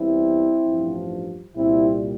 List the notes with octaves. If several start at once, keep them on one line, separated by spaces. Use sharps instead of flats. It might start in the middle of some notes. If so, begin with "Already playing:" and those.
Already playing: E2 E3 G3 C4 E4
A1 G2 F3
C2 A#2 G3 C4 E4